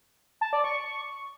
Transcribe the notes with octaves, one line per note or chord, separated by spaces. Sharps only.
A5
D5
C#6